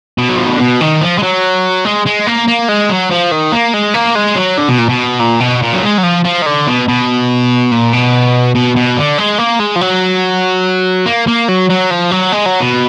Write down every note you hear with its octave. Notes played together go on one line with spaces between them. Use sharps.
B2
F#3
F3
D#3
D3
B2
D#3
F3
G#3
F#3
G#3
G#3
A#3
A#3
G#3
F#3
F3
D#3
A#3
G#3
A#3
G#3
F#3
D3
B2
A#2
B2
A#2
B2
A#2
F#3
G#3
F#3
F3
F3
D#3
D3
B2
B2
A#2
B2
B2
B2
D3
G#3
A#3
G#3
F3
F#3
A#3
A#3
F#3
F#3
F3
F#3
G#3
F#3
B2